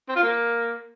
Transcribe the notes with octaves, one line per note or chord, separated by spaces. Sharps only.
C4
F4
A#3